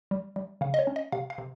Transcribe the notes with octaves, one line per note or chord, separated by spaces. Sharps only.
G3
G3
C#3 F5
D#5
C#5
C#4
D#5
C3 F5
F5
C3